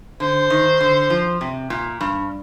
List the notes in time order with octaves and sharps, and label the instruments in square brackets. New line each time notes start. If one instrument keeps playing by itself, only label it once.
[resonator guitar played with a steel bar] D3 [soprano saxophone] C5
[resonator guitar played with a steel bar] D#3
D3
F3
C3
A#2
G2